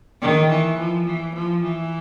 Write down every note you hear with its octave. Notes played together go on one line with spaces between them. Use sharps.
D#3
E3
F3
E3
F3
E3